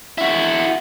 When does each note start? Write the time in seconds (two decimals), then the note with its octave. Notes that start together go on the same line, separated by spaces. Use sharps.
0.18 E4 F#4